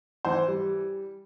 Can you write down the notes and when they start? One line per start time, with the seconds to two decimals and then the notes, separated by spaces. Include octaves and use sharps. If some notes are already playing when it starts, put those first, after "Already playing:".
0.25 E3 C5
0.48 G3